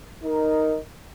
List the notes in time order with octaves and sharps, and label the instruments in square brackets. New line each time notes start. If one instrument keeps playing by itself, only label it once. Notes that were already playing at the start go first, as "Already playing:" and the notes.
[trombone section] D#4 A#4